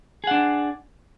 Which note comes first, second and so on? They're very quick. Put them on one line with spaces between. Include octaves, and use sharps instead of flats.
G#4 F#5 D4